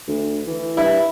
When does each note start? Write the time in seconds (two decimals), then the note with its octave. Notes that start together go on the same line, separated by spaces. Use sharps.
0.08 D2
0.47 E3
0.77 G2 E4